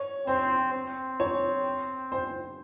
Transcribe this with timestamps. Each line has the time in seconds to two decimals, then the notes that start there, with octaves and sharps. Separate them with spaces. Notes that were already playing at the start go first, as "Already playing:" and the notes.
Already playing: C#5
0.27 C4 C5
0.73 C4
1.20 C#5
2.12 C5